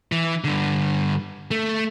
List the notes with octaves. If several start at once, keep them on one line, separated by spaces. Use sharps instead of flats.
E3
G2 D3
A3